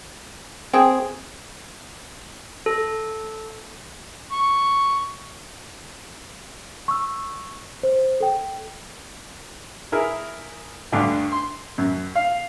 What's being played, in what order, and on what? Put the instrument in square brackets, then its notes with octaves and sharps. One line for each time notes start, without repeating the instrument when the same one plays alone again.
[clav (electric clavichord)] C4 G#4 [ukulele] G5
[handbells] A4
[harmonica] C#6
[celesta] C#6 E6
C5
A4 G5
[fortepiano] E4 G#4 A#4
D2 G2 D3
C6
F#2
F5